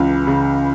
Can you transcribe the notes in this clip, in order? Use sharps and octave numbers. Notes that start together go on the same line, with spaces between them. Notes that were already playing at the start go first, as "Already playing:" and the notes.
Already playing: C#2 C#3 E3
C#3